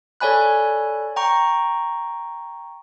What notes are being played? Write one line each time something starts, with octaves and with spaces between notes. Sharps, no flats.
A4 C#5 D5 G#5 B5 F#6
G5 A#5 C#6